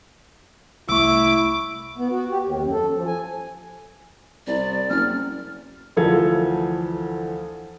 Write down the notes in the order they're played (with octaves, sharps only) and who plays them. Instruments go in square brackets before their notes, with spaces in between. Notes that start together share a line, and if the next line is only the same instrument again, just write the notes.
[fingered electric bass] C2 A3 [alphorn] E4 [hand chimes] C#6 E6 [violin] D6
[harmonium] B3
F#4
G4
D#2
F#2
A4
F3
G#5
[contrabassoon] C2 [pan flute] D5
[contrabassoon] F#1 [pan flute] F6
[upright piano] D2 E3 F3 A4 F5 G#6